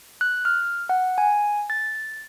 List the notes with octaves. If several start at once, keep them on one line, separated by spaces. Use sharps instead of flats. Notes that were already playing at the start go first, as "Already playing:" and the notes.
F#6
F6
F#5
G#5
A6